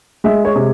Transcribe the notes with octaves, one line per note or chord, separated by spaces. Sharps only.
G#3 E5
C#5
C3